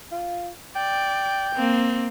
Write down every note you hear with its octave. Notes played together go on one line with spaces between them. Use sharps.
F4
D5 G5
A#3 C4